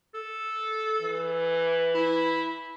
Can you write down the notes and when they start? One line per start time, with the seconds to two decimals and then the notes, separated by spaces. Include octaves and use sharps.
0.14 A4
1.02 E3
1.95 E4